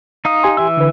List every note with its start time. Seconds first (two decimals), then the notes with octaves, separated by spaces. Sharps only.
0.25 D#4 F5 D#6
0.43 G4 G#5 C6
0.57 E3 E5 E6
0.77 D3 B4